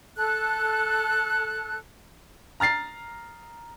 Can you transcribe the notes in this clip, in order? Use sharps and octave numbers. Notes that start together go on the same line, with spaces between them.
A4 F#6
A#5 F6 A6 C7